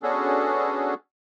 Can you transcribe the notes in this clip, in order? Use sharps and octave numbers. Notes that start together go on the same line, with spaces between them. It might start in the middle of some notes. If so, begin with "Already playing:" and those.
B3 C#4 D4 F#4 G#4 A4